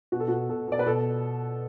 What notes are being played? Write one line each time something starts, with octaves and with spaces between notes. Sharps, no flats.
B2 F#4
A4
B2 F#4
B2 A4
B2 D5
B4
B2 A4